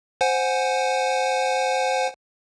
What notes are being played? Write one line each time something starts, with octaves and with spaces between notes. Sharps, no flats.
C5 F#5 G#5